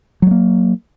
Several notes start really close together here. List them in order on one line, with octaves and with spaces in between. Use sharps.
F#3 G#3 A#3